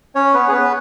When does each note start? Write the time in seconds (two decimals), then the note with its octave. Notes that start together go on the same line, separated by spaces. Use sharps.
0.15 C#4 C#5
0.34 B3 B4
0.48 G#4
0.53 B3 B4